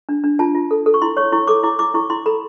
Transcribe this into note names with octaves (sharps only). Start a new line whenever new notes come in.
D4
D4
F4 A5
F4
A4
A4
C#6
E4 C6
C#5 C#6
E4 C#6
A4 D6
E4 D6
E4 D6
E4 C#6
E4 C6
A4 B5